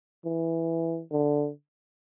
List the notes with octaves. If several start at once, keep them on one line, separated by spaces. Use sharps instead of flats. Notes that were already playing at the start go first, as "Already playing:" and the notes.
E3
D3